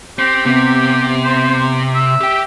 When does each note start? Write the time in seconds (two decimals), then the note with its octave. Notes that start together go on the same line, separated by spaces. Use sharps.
0.19 C4 G4
0.46 C3 B3 C4 G4
1.23 C5
1.95 E5
2.21 G4 G5